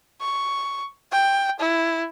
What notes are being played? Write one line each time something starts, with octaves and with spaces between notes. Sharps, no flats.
C#6
G5
E4